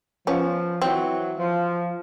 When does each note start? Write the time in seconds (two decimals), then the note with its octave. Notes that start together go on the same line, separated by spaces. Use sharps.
0.27 F3 B3 C#4
0.81 E3 F#3 C4
1.38 F3